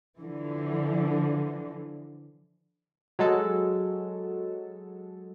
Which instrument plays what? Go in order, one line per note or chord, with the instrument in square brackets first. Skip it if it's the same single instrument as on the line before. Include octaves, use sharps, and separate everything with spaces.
[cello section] D3 E3 F3
[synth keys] F#3 G#3 A4